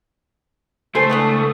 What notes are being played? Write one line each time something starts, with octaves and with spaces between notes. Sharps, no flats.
C#2 A3 A4 C5 G#5 C7
E3 B3 D4 D#6